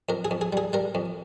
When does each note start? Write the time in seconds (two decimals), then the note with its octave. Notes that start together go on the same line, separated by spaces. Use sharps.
0.09 F2 A#4
0.25 G#4
0.31 F2
0.41 G#4
0.53 G3 G#4
0.73 G3 A#4
0.95 F2